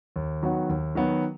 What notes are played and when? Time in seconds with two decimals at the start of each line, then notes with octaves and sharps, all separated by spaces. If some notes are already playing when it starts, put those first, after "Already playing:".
0.16 D#2
0.43 D#3 F#3 B3 F#4
0.69 D#2
0.95 D#3 F#3 B3 F#4